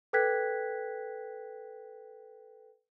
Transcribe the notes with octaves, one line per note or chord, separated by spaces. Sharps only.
A4 B4 G5 F#6 G#6 B6